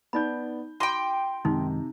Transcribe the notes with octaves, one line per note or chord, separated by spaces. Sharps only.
B3 D#4 D5 B5 G6
F#4 G5 B5 C6 D6 A#6 D#7
F#2 C3 D#3 G#3 D#4